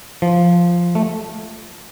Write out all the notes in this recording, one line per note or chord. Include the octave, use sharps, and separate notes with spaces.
F3
A3